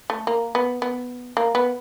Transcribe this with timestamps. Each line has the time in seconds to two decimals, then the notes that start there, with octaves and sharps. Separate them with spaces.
0.10 A3
0.27 A#3
0.55 B3
0.82 B3
1.37 A#3
1.55 B3